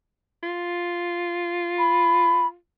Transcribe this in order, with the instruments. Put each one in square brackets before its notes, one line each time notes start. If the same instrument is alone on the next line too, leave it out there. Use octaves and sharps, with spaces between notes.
[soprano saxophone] F4
[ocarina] B5